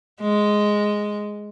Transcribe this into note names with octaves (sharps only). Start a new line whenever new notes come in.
G#3